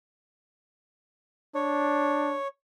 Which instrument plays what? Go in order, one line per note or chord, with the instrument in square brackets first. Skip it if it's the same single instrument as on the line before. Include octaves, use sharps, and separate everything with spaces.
[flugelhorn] D4 [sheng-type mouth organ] C#5